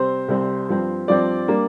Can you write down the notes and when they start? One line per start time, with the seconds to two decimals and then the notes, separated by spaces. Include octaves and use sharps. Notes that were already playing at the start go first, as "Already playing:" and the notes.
Already playing: C3 G3 C4 C5
0.28 C2 C3 G3 C4
0.69 G2 F3 C4
1.08 G2 F3 C4 D5
1.48 G3 A#3 D4